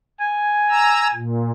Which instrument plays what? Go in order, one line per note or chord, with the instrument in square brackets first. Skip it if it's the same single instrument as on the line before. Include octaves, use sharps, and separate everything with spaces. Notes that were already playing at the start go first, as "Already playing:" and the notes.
[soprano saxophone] G#5
[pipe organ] A#5 E6
A#2